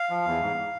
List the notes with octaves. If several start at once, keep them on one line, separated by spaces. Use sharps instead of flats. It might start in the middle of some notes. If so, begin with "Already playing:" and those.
Already playing: F5
F3
E2
G#2